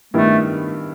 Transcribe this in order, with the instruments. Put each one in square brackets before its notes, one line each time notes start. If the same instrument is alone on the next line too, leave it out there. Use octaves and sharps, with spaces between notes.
[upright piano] G2 D#3 G3 B3 E4 [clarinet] A3